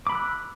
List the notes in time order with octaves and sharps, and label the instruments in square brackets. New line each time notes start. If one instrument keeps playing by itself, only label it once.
[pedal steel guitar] D6
B5
E6
F#6